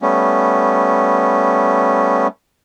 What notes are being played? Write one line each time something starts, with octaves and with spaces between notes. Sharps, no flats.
G3 A3 B3 C#4